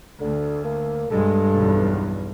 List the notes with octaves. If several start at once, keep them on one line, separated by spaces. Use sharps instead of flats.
D2 D3
A#3
B1 G2 G#3 A4
B1 E2